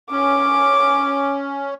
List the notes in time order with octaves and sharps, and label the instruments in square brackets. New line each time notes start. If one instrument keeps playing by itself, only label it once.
[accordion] C#4 [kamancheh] D6